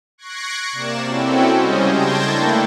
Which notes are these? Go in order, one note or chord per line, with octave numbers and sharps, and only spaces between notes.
C#6 F#6 G#6 A#6 C7 D7
C3 A#3 D5 E7
C4 C#4 E4 F#4 A4 G5
C#3 G3 G#3 C#4 C5 D#5
G5 A5 C6 G6 G#6 A#6
D3 A3 A#3 D4 E4 A4